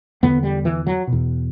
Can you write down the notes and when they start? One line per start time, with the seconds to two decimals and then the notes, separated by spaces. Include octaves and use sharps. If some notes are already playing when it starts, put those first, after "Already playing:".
0.23 E2 D3 B3
0.43 G3
0.65 E3
0.87 F#3
1.07 B2
1.13 E2